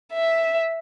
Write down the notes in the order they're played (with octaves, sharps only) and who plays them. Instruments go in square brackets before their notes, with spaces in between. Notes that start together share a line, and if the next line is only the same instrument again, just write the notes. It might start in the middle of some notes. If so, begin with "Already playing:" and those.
[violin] E5